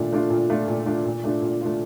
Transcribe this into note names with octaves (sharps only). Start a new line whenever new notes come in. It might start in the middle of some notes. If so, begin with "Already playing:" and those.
Already playing: A#2 A3 D4 F4
A3 D4 F4
A#2
A3 D4 F4
A#2
A3 D4 F4
A#2
A3 D4 F4
A#2
A3 D4 F4